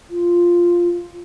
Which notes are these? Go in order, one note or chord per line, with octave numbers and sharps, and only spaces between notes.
F4